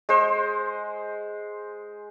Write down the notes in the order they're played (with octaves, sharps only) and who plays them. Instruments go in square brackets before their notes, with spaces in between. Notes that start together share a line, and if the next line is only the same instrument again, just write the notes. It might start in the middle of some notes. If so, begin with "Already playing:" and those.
[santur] G#3 C5